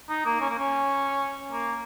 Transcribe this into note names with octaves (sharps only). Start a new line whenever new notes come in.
D#4
A#3
C#4
A#3
C#4
A#3